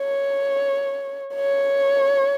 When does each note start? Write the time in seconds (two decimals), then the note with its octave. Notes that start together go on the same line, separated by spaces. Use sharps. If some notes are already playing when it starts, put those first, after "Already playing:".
Already playing: C#5
1.35 C#5